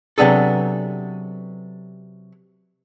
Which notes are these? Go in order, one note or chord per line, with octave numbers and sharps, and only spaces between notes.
C3 F#3 B3 D4 G#4 A4